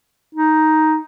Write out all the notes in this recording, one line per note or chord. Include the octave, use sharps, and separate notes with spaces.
D#4